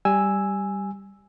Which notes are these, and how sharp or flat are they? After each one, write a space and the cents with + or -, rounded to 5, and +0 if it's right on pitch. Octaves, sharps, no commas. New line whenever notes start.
G3 +0 G#5 -5 E6 +0